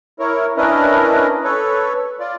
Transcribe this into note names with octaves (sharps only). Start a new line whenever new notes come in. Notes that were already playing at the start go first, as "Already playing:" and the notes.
E4 A#4 C#5
C#4 D4 E4 A#4 B4 D#5
A4 B4 C#5
F4 D5